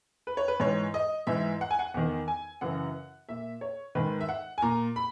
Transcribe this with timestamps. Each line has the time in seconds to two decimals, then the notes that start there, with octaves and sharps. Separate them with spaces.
0.27 B4
0.37 C#5
0.48 B4
0.60 G#2 E3 C#5
0.94 D#5
1.27 G#2 E3 E5
1.61 F#5
1.71 G#5
1.79 F#5
1.94 E2 D#3 F#5
2.28 G#5
2.61 F#2 C#3 E3 F#5
3.29 A#2 E5
3.61 C#5
3.95 G#2 D#3 B4
4.21 E5
4.29 F#5
4.58 G#5
4.62 A#2 A#5
4.96 B5